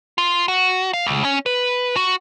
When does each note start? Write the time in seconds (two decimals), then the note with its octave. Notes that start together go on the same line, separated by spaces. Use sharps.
0.18 F4
0.48 F#4
0.94 F5
1.06 C#2
1.25 C#4
1.46 B4
1.96 F#4